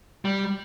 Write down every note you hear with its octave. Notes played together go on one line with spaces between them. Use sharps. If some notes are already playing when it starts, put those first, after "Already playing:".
G3